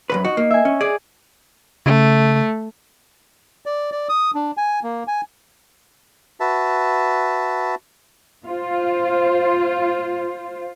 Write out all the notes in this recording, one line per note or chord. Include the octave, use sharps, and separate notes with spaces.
F#2 B2 B4
D#4 F#4
A#3
E5 G#5
C#4
G#4 D5
C#3 A3
D5
D5
D#6
D4
G#5
A#3
G#5
F#4 B4 E5 A5
F4 C5